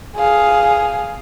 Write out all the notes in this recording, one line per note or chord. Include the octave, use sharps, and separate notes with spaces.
G#4 F5